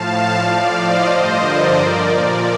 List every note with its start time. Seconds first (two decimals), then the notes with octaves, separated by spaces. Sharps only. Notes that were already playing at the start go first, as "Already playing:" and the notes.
Already playing: A2 F3 F5 A5
0.37 A2 F3 D5 F5
0.72 C5 D#5
1.07 G2 D3 F3
1.41 A#4 D5
1.76 A#2 F3 A#4 D5
2.11 A#4 D5